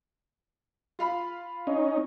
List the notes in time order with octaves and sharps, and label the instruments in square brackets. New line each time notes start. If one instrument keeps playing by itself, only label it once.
[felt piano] F4 F5 B5
[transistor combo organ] C#4 D#4